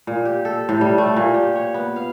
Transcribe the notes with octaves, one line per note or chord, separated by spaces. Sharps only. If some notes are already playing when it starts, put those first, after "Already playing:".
A#2
G4
A4
A2
G3
A3
A#2
G4
C#5
B3
F5